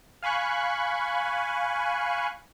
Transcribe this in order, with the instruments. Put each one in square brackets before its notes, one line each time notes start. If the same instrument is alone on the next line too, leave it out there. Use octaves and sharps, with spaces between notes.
[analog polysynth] F5 G#5 B5 C#6 F#6